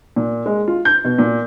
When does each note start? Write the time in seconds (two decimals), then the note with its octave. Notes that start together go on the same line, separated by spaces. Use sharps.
0.16 A#2
0.46 G#3
0.68 F4
0.85 G6
1.04 B2
1.18 A#2